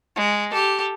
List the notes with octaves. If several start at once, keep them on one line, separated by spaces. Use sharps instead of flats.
G#3
G4 A4